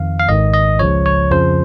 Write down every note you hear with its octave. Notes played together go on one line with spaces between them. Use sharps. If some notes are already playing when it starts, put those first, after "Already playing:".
Already playing: F2 D#3 F5
F5
G#1 G#2 D#3 D#5
D#5
C#2 C#3 F3 C#5
C#5
F2 C#3 F3 C5